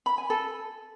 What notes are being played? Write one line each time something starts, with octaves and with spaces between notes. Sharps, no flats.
B5
G#5
A4